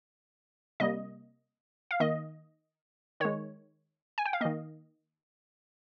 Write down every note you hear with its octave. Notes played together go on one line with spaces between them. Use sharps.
C3 G3 A#3 D#5
F5
D#3 A#3 D#5
D#3 G#3 C#5
G#5
G5
F5
D#3 A#3 D#5